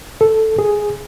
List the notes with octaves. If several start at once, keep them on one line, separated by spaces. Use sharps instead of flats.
A4
G#4